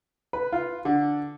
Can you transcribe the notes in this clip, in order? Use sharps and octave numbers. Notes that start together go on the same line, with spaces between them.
B4
F4
D3